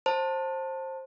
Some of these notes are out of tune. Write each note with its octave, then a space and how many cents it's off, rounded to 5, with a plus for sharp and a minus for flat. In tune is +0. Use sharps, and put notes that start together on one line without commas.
C5 +20 A5 +15